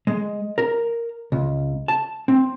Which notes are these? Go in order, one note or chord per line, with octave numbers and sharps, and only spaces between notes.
G#3
A#4
C#2
A5
C4